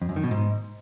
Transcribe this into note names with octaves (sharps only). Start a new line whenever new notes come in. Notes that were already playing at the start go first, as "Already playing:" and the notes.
F2
F#2
D#3
B2
G#2